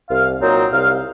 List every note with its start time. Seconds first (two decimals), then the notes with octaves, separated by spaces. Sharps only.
0.09 C2 F5
0.40 A#2 F#3 C4 D#4
0.71 C2 F5